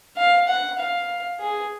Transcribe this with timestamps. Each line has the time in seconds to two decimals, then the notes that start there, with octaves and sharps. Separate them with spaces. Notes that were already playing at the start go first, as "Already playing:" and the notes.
0.17 F5
0.48 F#5
0.79 F5
1.40 G#4